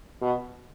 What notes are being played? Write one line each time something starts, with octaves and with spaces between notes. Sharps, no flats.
B2